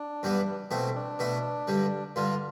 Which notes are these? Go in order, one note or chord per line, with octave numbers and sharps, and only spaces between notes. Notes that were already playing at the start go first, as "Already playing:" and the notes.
Already playing: D4
G2 E3 G3 B3
B2 A3 C4 E4
D4
B2 A3 E4
G2 D3 G3
G2 D3 G3 F4